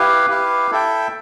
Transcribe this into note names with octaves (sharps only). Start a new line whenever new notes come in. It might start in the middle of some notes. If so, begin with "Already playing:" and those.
Already playing: E4 G4 B4 F5
E4 G4 B4 F5
E4 A4 E5 G5